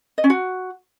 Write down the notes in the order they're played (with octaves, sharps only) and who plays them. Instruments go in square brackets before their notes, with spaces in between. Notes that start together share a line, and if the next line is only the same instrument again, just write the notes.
[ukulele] D#5
C#4
F#4